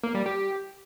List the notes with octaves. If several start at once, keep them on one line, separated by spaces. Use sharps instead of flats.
A#3
G3
G4